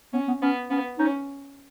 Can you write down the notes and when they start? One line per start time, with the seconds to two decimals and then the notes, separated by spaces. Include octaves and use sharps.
0.13 B3 C#4
0.28 B3
0.42 B3 C#4
0.71 B3 C#4
0.98 C#4 D#4